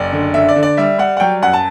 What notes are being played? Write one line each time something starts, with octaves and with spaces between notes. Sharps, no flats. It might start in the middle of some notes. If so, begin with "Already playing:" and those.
Already playing: F#1 D5
D3
D3 E5
D5
D3
D5
G3 E5
G3 F#5
F#5
F#3 G5
F#2 F#5
A5